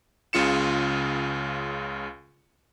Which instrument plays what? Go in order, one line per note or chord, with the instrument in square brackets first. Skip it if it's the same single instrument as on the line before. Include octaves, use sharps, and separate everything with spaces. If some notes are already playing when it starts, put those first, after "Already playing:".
[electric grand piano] C#2 C#3 F4 C#7 E7